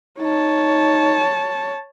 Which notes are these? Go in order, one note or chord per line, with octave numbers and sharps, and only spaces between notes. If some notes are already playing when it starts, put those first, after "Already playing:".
D#4 C#5 A5